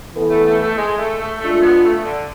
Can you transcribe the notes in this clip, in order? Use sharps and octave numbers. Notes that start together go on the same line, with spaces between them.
E3 B3 E4 A4
A3
A3
A3
G#3
A3
A3
G#3 A3 D4 F4
B3
A3
D3